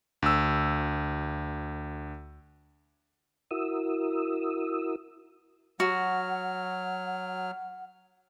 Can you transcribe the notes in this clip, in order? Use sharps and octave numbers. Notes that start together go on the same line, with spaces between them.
D2 E6
E4 F#4 A#4 D#6 E6
F#3 F#4 F#5 F6